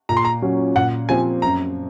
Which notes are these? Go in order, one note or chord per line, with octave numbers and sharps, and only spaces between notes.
A#2 A#5
C6
A#5
F#3 C#4
A#2 F#5
F3 C4 G#5
F#2 A#5